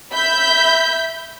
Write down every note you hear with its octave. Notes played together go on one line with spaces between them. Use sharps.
E5 B5 G6 B6